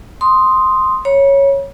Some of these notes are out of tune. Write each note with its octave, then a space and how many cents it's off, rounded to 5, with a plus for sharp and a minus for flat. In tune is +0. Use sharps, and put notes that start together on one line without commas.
C6 +0 D#6 +0
C#5 -5 B5 -45